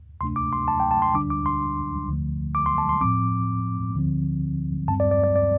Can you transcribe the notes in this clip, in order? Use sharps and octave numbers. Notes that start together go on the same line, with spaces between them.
D2 C3 A3 D4 C6
D6
C6
A5
G5
A5
C6
D2 D3 G3 D4 D6
D6
C6
D2 D3 F3 A3
D6
C6
A5
C6
A2 F3 C4 D6
D2 D3 F3 C4
G2 G3 C4 A5
D5
D5
D5
D5